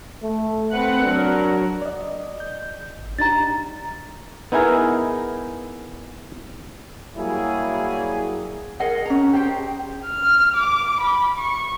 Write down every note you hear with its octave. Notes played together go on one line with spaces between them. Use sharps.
A3
C4 B4 F#5
F#3 D4 A#4
D5 D#5
G6
G#1
D4 D#4 G4 A#5 A6
B3 D#4 E4 G#4 A#4
F#3 G3 A#3 E4 F#4 G#4
G#4 A#4 D#5 F#5
C#4 A#5
G4 G#4 C5 G5
F6
D6
B5
C#6